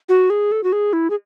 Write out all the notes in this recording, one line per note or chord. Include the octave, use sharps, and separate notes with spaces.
F#4
G#4
A4
F#4
G#4
E4
G#4